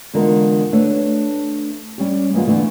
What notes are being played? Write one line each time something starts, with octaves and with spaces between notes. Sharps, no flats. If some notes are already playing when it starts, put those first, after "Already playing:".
E2 D3 G#3 F4 A#4
A3 D4 A4 B4 C#5
G3 C#4 G4
E3 G#3 A#3 B3 F4
D3 E3 A3 B3 D4